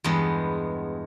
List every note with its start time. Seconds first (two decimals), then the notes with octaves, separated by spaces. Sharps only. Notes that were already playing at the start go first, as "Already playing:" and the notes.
0.04 E2 G2 G#3 B3